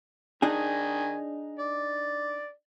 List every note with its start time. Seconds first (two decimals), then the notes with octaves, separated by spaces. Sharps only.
0.42 D#3 D4 D#4 G#4 G#5
1.59 D5